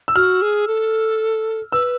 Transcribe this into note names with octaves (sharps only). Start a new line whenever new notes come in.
E6
F#4 F6
G#4
A4
B4 E6